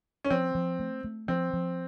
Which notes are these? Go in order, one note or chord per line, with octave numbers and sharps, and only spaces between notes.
C#4
F3 C4
F3
A3
A3
F3 C4
F3